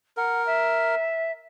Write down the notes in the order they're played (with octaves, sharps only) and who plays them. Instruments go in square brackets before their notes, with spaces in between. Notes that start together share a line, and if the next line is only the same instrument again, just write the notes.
[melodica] A#4 [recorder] F#5
[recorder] E5